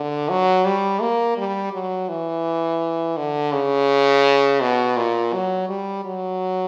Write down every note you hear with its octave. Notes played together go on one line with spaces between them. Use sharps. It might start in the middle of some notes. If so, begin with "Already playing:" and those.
Already playing: D3
F#3
G3
A#3
G3
F#3
E3
D3
C#3
B2
A#2
F#3
G3
F#3